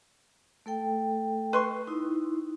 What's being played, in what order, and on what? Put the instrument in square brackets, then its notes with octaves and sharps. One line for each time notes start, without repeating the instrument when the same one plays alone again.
[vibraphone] A3 A4 G5
[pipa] B4 C6 C#6
[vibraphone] D#4 E4